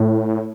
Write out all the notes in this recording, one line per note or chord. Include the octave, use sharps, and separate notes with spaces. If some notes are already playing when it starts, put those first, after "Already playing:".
Already playing: A2